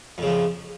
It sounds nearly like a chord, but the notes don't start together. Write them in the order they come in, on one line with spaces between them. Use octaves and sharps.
F2 C#3 F3